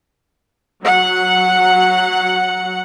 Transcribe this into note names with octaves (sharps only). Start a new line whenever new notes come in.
F#3 F#5